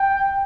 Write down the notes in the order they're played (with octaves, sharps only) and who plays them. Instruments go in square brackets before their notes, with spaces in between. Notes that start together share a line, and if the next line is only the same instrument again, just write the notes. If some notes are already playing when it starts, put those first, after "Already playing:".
Already playing: [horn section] G5